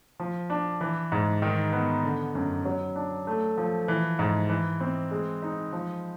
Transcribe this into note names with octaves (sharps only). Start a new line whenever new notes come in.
F3
D4
E3
G#2
D#3
B3
D3
F#2
F#3
D4
A3
F3
E3
G#2
E3
C4
G#3
D#4
F3